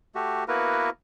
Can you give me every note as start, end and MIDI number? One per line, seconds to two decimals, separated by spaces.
0.15 0.44 57
0.15 0.44 66
0.15 0.44 67
0.48 0.90 58
0.48 0.90 59
0.48 0.90 64
0.48 0.90 66
0.48 0.90 70
0.48 0.90 71